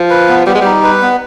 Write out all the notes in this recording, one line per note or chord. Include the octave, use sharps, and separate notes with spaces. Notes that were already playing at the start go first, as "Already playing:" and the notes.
Already playing: F3
B4
B3
G3 B3
G#3
G3 D#4
B4
B3